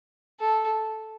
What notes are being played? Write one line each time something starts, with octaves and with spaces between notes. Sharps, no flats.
A4